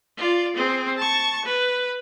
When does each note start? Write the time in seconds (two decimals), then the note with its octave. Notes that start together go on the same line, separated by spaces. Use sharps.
0.17 F4 D5
0.56 C4 G#4
0.97 A5 C#6
1.45 B4